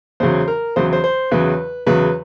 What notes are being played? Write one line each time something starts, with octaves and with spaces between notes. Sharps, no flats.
E2 C#3 F#3 C5
A#4
E2 C#3 F#3 C5
C5
C5
E2 C#3 F#3 B4
E2 C#3 F#3 B4